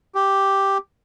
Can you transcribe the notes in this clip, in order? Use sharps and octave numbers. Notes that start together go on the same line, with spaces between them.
G4